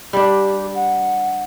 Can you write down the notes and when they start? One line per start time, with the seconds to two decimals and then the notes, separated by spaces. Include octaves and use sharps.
0.13 G3 D4 G4
0.74 F#5